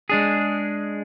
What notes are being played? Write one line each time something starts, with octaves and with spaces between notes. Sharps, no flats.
G#3 D4 G#4